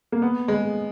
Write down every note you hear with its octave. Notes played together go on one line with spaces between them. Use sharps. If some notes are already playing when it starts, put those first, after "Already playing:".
A#3
B3
G#3